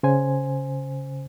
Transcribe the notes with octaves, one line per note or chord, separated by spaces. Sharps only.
C#3 C5 G#5